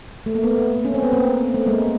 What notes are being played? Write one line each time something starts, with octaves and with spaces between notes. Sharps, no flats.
A3
A#3
A3 B3
C#4
C4
B3
A#3 C4
A3
G#3 A#3